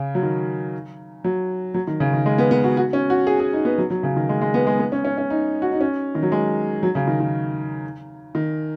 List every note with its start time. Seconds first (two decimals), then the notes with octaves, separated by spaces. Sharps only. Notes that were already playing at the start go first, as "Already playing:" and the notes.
Already playing: C#3
0.15 F#3
0.23 D#3
1.24 F#3
1.74 F#3
1.87 D#3
2.00 C#3
2.13 D#3
2.26 G#3
2.38 B3
2.51 B3
2.64 F#4
2.77 F#4
2.93 C#4
3.10 F#4
3.27 G#4
3.40 G#4
3.53 D#4
3.65 B3
3.78 F#3
3.90 F#3
4.03 C#3
4.16 D#3
4.29 G#3
4.42 G#3
4.54 B3
4.67 G#3
4.79 B3
4.92 C#4
5.05 C#4
5.18 C#4
5.30 D#4
5.62 F#4
5.72 D#4
5.81 C#4
6.15 D#3
6.23 F#3
6.32 G#3
6.83 F#3
6.95 C#3
7.07 D#3
7.20 D#3
8.35 D#3